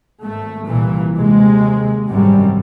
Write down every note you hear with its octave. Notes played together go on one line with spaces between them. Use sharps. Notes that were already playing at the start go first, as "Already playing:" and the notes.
G#1 A3
C2 A#2 E3
D#2 C3 G#3
G#1 F#2 C3 G3